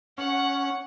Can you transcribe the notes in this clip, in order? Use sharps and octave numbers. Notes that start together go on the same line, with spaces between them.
C#4 F#5